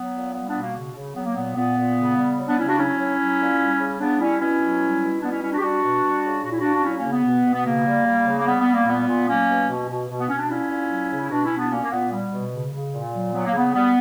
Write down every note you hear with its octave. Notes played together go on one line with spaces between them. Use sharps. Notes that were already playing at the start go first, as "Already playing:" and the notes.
Already playing: F#3 B3
A#2
G3 B3
B3 D4
B2
A#3
C#3
C#3
F#3 B3
A#3
A#2 B3
A#2 B3
A#2
C#3
G3
F#3
B3 D4
C#3 C#4 E4
D4 F#4
F#3 C#4 E4
F#3
F#3
A#2
G3
C#3
C#3 B3 D4
G3 C#4 E4
B2 C#4 E4
F#3
G3
B2
G3 B3 D4
C#4 E4
G3 C#4 E4
D4 F#4
G4
G3 D4 F#4
B2
G3
C#3
A#2 F#4
E4
A#2 D4 F#4
D4
F#3 C#4 E4
A#3 C#4
C#3
B3
B2
B2
B3
C#3 A#3
G3
G3
C#3
A#3
G3 B3
B3
G3
A#3
A#2 B3
A#2
F#3 A#3 C#4
B2
B2
B2
B2
B3
B2 C#4
D4
A#2 C#4 E4
A#2
F#3
C#3
E4
B2 D4 F#4
C#4 E4
B2
B3 D4
A#2 A#3 C#4
A#3
A#2 B3
G3
B2
C#3
C#3
A#2
F#3
F#3 B3
A#3
C#3 B3
G3 B3